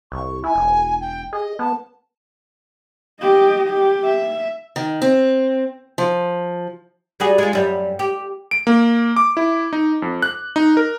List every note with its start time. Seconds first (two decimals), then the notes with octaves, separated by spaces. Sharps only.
0.12 C2 C#6
0.44 E4 G#5
0.56 E1
1.01 G5
1.33 G#4 D#5
1.59 B3 A5
3.22 G4 D#5
3.70 G4
4.05 E5
4.76 D#3
5.02 C4
5.98 F3
7.20 G3 F#4 G#4
7.38 G#3 F4
7.53 F#2 G3
7.99 G4
8.51 D7
8.67 A#3
9.16 D6
9.37 E4
9.73 D#4
10.02 F2
10.22 F#6
10.56 D#4
10.77 A#4